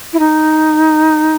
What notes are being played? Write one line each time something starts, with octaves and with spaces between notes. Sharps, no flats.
E4
D#4